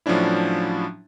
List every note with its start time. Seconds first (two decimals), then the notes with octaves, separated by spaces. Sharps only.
0.06 A2 F3 F#3 C#4 D4 E4